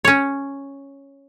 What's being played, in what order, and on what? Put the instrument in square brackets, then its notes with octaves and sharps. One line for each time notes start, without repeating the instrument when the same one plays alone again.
[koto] C#4 C#5